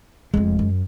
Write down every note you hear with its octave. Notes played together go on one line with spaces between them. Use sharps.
F1 F2 G#3
F#2